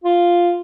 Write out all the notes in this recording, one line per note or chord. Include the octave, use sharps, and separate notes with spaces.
F4